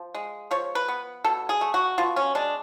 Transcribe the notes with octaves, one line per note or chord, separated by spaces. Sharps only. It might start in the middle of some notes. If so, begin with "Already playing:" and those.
Already playing: F3
G#3
F3 C#5
B4
B3
B2 A4
G#4
A3
F#4
B2 F4
C#4
G#3 D4